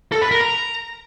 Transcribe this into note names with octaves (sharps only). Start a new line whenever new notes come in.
A4
B4
A#4
A#5